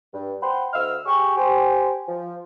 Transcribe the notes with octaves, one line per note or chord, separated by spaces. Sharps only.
G2
C5 F#5 G5 B5 C6
D2 D#5 E6 F6
G4 G#4 G#5 C#6
G4 C5 G#5
F3